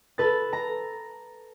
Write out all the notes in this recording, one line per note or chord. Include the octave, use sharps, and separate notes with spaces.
A4 B4 A6
A#5